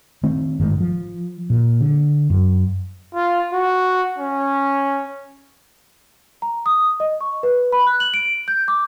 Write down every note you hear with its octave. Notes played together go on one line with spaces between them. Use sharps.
D#3 A3 C4
G1 G#2 D#3 G#3
F3
A#2
D3
F#2
F4
F#4
C#4
A#5
D#6
D#5
C#6
B4
B5
F#6
F#7
D7
G6
D6